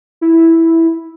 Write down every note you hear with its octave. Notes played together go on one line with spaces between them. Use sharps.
E4